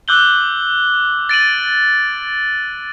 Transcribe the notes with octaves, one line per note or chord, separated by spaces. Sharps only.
D6 E6 F#6 G6 F#7 G7
A6 D7 D#7 F#7